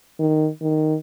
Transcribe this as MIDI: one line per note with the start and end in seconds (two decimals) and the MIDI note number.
0.19 0.49 51
0.61 0.95 51